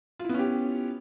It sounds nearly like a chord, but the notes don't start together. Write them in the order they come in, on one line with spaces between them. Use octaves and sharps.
F4 E4 B3 C#4 G4